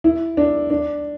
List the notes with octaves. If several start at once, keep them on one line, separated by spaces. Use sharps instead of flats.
E4
D4
D4